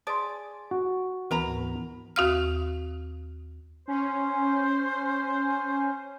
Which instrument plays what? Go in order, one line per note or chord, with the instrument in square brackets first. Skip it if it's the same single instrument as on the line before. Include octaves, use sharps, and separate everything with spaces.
[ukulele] G#4 D5 [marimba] A5 C6
[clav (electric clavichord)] F#4
[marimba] D2 [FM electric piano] E3 B3 [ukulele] A#4 A#5 B5
[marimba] G#2
D#2 F#4 F5 F6
[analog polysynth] C#4 [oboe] C5